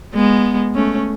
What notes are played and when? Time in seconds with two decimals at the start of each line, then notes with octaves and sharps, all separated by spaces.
0.15 G#3 B3
0.75 A3 C#4